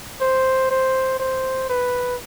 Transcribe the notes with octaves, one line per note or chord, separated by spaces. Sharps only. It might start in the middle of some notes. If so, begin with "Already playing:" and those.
C5
C5
C5
B4